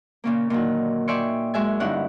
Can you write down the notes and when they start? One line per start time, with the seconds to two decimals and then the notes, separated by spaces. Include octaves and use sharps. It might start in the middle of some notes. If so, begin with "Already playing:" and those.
0.24 A#2 C#3 A#3
0.50 A#2 D3 D#3 F#3
1.08 D5 E5 G5 G#5 C6 C#6
1.54 F#2 G#3 E5 G#5
1.80 G2 D3 C#4 D#4 E4 F#5